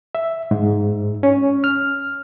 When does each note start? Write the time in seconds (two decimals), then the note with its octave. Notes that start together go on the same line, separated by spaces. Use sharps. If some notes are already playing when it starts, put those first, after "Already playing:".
0.15 E5
0.51 G#2
1.23 C#4
1.64 F6